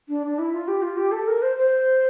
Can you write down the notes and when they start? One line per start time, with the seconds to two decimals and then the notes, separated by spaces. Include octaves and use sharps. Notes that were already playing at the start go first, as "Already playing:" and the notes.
0.09 D4
0.26 D4
0.39 E4
0.53 F4
0.68 G4
0.82 F4
0.97 G4
1.12 A4
1.28 A#4
1.42 C5
1.56 C5